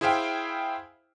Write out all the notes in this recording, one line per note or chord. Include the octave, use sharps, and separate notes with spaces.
E4 G#4 C5 E5 F5 G5